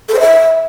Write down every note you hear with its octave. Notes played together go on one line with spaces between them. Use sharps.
A4
C5
E5